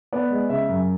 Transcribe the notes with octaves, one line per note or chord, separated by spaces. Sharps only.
B3 D5
G#3
C#3 E5
F#2